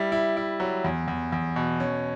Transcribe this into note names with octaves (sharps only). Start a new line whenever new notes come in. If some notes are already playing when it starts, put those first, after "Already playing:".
Already playing: G3 E4
E4
E4
F#3
E2
E2
E2
B2
C#4